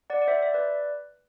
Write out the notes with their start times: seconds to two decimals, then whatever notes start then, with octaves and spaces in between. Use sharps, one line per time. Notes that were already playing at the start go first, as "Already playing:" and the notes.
0.10 D5 F#5
0.22 D5
0.28 C5 E5
0.42 E5
0.54 B4 D5